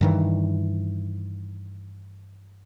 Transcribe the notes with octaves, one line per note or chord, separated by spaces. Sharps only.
G2 D#3 E3